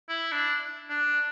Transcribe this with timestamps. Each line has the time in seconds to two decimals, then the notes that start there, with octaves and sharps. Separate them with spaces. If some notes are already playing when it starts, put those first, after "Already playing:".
0.09 E4
0.32 D4
0.89 D4